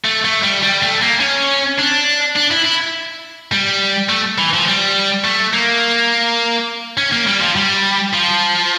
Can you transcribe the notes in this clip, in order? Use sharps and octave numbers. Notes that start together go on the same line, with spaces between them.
A3
A3
G3
G3
A3
A#3
C#4
D4
D4
E4
E4
G3
A3
E3
F3
G3
A3
A#3
C#4
A#3
G3
F3
G3
F3